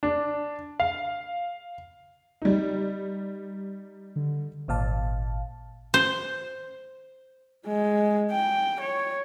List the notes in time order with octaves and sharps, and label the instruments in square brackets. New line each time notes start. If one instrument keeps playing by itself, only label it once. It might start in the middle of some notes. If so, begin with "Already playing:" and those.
[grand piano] D4
F5
[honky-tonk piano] G3 D#4
[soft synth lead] D3
[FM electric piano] G#1 A#2 F5 A5
[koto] C5
[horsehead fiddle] G#3
G5
C#5